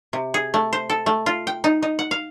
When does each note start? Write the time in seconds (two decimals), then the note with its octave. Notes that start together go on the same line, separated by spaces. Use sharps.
0.13 C3
0.34 G#4
0.54 A3
0.73 C5
0.90 A4
1.06 A3
1.26 F4
1.47 G5
1.64 D#4
1.82 D#4
1.99 F#5
2.11 F5